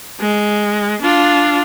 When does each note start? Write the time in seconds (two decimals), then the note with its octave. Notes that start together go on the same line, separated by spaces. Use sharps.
0.21 G#3
1.02 D4 F4